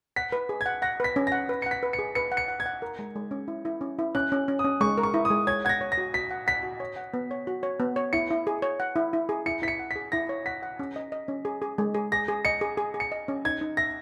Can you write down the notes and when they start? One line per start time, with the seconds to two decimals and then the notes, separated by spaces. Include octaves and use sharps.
0.16 F#5 B6
0.32 B4
0.49 G#4
0.61 G#6
0.66 F#5
0.82 F#5 A#6
1.00 B4 B6
1.16 C#4
1.27 A#6
1.32 F#5
1.49 B4
1.62 C#7
1.66 F#5 B6
1.83 B4
1.93 C#7
1.99 G#4
2.15 B4 C#7
2.32 F#5
2.37 C#7
2.48 F#5
2.60 G#6
2.66 F#5
2.82 A#4
2.99 G#3
3.16 G#3
3.31 C#4
3.48 E4
3.65 E4
3.81 C#4
3.99 E4
4.15 C#4 F#6
4.32 C#4
4.48 C#4
4.59 D#6
4.64 C#4
4.81 G#3 C#6
4.98 A#4
5.03 C#6
5.14 E4
5.25 D#6
5.30 G#3
5.47 C#5 G#6
5.65 F#5 G#6
5.69 A#6
5.81 C#5
5.92 A#6
5.98 F#4
6.14 F#4 B6
6.31 F#5
6.47 F#5 B6
6.63 F#4
6.80 C#5
6.96 F#5
7.14 B3
7.31 C#5
7.47 F#4
7.63 C#5
7.80 B3
7.96 C#5
8.13 E4 C#7
8.30 E4
8.47 G#4
8.62 C#5
8.80 F#5
8.96 E4
9.13 E4
9.29 G#4
9.46 E4 C#7
9.62 E4 B6
9.68 C#7
9.79 F#5
9.91 B6
9.96 G#4
10.12 E4 A#6
10.29 C#5
10.46 F#5 B6
10.63 F#5
10.79 C#4
10.96 D#5
11.12 D#5
11.28 C#4
11.45 G#4
11.62 G#4
11.78 G#3
11.95 G#4
12.12 G#4 A#6
12.28 G#4
12.45 D#5 C#7
12.61 G#4
12.78 G#4
12.94 G#4
13.00 C#7
13.12 D#5
13.28 C#4
13.45 D#4 G#6
13.61 D#4
13.77 E5 A#6